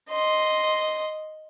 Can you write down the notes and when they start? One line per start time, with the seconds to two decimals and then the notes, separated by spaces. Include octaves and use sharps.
0.10 D#5 C6